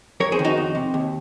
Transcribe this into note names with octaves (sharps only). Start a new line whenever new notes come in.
F2 A#4 C#5
G#4 C5
D#3
D#4 F#4
F2
C3
D#2